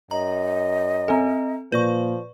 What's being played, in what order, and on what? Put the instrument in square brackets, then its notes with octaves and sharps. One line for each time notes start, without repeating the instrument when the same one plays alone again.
[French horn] F#2 [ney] D#5 [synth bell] A#5
[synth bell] C4 A4 [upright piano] E5 G#5 A#5
[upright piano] A#2 [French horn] F3 [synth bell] B4 D5 C#6